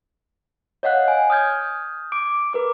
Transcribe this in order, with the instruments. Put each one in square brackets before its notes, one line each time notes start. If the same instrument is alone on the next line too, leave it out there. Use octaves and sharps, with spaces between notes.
[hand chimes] C#5 D#5 F5 F#5 F#6
G#5
D#6 F6 G6 G#6
D6 D7
A#4 B4 D6